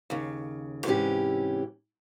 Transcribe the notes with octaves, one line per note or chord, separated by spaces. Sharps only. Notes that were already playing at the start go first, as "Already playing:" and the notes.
D#2 C#3
G#2 C3 E3 C#4 G4